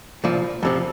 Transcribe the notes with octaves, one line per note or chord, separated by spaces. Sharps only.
C2 A#2 F3
F2 C3 F3